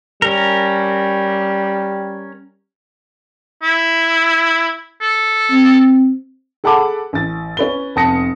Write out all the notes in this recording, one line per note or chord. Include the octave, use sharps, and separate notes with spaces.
G3 C#4 A#4
E4
A4
C4
G#4 A4 F#5 A5 B5 D6
A1 A6
C#4 B4 G7
F1 B3 A5 D#6 A#6 C#7